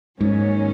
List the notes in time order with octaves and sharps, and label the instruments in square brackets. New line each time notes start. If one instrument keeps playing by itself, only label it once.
[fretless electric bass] G#2 [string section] D#3 F#3 A#3 C#4